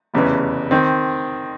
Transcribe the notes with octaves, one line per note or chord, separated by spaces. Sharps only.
F1 E2 C#3 E3
D#3 C4